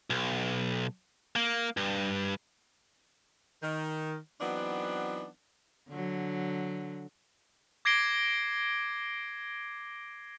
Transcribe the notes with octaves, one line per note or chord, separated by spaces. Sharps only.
B1
A#3
G2
D#3
E3 F#3 B3 C4 D4 D#4
D3 F#3
D6 G#6 A#6 C7 D7 G7